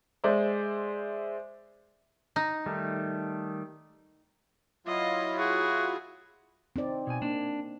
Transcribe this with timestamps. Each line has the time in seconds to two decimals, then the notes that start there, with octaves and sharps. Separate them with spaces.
0.24 G#3 C5 D5 E5
2.36 D#4
2.66 D#3 G3 A3
4.86 F#3 E4 F4 D#5 F5
5.38 F#4 G#4
6.76 C4 D#4 D5
7.07 B2 G#5
7.22 A#3 D4